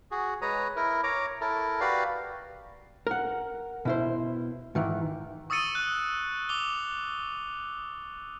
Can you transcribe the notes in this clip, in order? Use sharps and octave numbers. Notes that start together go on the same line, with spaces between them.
F#4 G#4
G#3 B4 C#5 A#5 D#6
E4 A#4
C#5 A#5 D6
E4 A4 A#4
F#4 G4 B4 D5 F5
A#4 F#5
B2 E4 C5
G#2 D#3 E3
C#6 D#6 E6 A6 C#7 D#7
F#6
D6 F7 G7